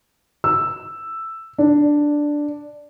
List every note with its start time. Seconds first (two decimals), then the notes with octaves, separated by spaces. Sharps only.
0.44 E6
1.58 D4